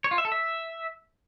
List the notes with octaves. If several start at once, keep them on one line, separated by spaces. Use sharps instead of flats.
C#5
F4
E5
A4
E5